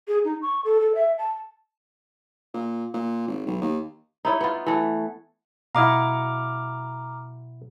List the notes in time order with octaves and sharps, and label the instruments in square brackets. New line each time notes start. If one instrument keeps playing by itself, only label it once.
[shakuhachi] G#4
D#4
C#6
A4
A4
E5
A5
[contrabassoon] A#2
A#2
G#1
B1
D#2
[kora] D#4 E4 C#5
B3 F4
E3 A3
[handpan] B2 F#5 [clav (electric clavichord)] E4 D#5 F5 [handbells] A#5 D6 F6